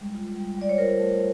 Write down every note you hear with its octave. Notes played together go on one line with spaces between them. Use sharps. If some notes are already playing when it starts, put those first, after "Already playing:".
Already playing: G3 G#3
F4
G3
G3 D5
C#5
F4 A#4 C5
A3